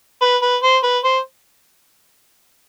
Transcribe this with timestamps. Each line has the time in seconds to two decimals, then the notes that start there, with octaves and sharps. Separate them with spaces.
0.22 B4
0.42 B4
0.63 C5
0.84 B4
1.04 C5